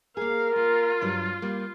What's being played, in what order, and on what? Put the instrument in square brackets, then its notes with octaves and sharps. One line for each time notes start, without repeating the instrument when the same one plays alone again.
[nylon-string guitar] A#3 G#4 [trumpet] A#4 [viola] F5
[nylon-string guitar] A#3 [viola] F4
[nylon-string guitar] G2 F#3 G3
G3 A#3